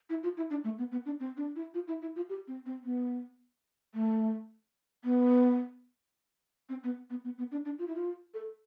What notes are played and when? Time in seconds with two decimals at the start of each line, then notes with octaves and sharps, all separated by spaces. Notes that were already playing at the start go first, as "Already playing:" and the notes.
0.10 E4
0.23 F4
0.37 E4
0.50 D4
0.64 A3
0.78 B3
0.92 B3
1.06 D4
1.20 C4
1.37 D4
1.56 E4
1.74 F4
1.88 E4
2.02 E4
2.16 F4
2.29 G4
2.48 C4
2.66 C4
2.84 B3
3.94 A3
5.04 B3
6.69 C4
6.83 B3
7.10 B3
7.25 B3
7.38 B3
7.52 D4
7.65 D4
7.79 F4
7.88 E4
7.95 F4
8.34 A4